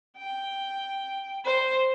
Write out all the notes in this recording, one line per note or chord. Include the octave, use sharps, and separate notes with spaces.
G5
C5